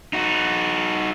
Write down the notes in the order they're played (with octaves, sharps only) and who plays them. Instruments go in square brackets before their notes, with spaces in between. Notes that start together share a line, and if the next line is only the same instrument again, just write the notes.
[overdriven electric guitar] D#4 F#4